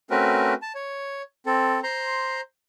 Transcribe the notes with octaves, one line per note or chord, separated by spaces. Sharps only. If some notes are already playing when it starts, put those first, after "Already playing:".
A3 C4 C#4 F#4 A#4 B4
A5
C#5
C4 A4
C5 A#5 C6